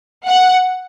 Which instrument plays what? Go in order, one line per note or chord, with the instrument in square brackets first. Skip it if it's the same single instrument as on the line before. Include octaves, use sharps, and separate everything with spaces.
[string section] F#5